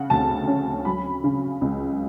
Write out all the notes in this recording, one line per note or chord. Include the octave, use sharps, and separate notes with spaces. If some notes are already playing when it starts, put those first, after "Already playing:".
Already playing: C#3 F#5
D2 A5
C#4
F#3 B5
C#3
C#2